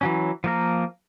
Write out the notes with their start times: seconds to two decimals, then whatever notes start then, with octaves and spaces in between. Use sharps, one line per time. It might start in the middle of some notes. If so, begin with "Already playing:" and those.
0.01 E3 F#3 C#4
0.44 F3 A#3 A#4